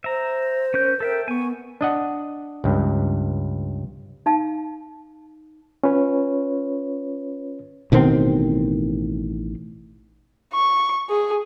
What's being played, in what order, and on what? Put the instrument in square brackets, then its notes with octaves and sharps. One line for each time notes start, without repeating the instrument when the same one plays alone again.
[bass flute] C5 [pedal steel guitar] E5 A#5
[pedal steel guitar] C#4 A#4 G6
[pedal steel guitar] A4 E5 G5 [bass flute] A#4
[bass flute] B3 [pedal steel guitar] G#5 C#6
[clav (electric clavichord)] D4 D#5 F#5
C#2 G2
[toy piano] D#4 F5 A5
[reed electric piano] C#4 F4 B4 C#5
[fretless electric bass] A1 B2 D#3 C4
[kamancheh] C#6
G#4